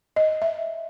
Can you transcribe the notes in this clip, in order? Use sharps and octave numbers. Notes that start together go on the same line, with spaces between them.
D#5
E5